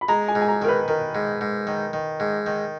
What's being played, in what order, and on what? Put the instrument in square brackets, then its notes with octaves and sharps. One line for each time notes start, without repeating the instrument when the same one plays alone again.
[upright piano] B5
[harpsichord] G#3 [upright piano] A#5
[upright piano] G#5
[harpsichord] G#2
[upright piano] G#5
A#5
[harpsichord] D#3 [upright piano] A#4
[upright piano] B4
[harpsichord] D#3 [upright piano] A#4
[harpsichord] G#2
G#2
D#3
D#3
G#2
D#3